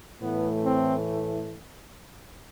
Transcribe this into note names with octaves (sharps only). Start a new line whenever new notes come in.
A2 E3 A3 B3
C4